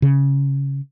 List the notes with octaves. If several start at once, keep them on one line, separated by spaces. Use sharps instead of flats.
C#3